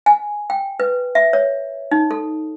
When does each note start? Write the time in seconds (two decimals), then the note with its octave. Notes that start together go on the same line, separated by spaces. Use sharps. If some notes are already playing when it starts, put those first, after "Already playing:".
0.06 G#5
0.50 G5
0.80 B4
1.15 E5
1.33 C#5
1.91 D#4
2.11 A4